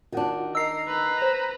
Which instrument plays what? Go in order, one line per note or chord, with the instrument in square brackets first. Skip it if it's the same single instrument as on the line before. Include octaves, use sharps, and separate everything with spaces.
[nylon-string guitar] D#3 D4 [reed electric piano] F4 F#4 F#5
[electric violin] A#4 [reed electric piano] D#5 [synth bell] E6 C7
[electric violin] B4 A#5
[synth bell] C5